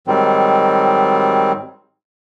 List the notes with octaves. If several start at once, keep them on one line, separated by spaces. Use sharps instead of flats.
G#2 D#3 F#3 G3 C4